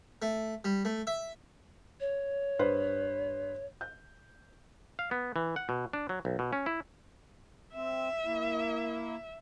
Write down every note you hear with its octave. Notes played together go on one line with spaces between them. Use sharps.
A3
G3
A3
E5
C#5
G2 B4 C5
G6
F5
B3
E3
F#5
B2
D4
F#3
B1
B2
C#4
E4
C4 E5
A#3 E4